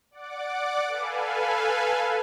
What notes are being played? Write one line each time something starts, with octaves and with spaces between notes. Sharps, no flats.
D5 F#5 D6
A4 B4 F5 G#5